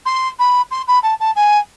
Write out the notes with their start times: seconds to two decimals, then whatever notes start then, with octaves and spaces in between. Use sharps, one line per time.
0.06 C6
0.39 B5
0.71 C6
0.88 B5
1.03 A5
1.20 A5
1.36 G#5